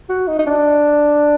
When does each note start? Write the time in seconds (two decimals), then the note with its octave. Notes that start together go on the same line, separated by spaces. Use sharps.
0.09 F#4
0.28 D#4
0.39 D#4
0.47 D4